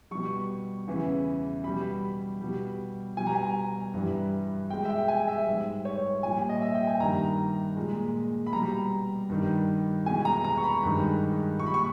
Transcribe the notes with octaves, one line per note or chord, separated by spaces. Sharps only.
B2 G3 C#6
E2 C#3 E3
B2 G3 B5
B2 G3
B2 G3 G#5
A#5
G#5
G2 E3 G3
B2 G#3 G5
E5
G5
G#5
E5
G#2 G3
C#5
A#2 G3 G#5
D#5
E5
G5
G#5
G2 D#3 G3 A#5
A#2 G#3
B5
B2 G3 A#5
G2 D#3 G3
E2 B2 G#3 G#5
A#5
A#5
C#6
B5
G2 D#3 G#3
A#2 G3 B5 C#6
C#6